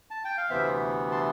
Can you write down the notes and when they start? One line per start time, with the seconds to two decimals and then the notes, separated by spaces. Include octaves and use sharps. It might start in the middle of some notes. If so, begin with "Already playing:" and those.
0.11 A5
0.25 G5
0.38 F5
0.50 D2 C3 E3 B3 C5 E5
1.11 A5 C6